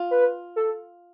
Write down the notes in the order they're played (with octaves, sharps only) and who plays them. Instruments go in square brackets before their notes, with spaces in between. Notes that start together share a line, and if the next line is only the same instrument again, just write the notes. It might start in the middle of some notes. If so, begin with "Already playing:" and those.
Already playing: [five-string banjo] F4
[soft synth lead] B4
A4